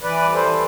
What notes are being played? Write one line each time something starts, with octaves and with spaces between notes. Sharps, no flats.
E3 B4 D5
G3
A4 C5
E3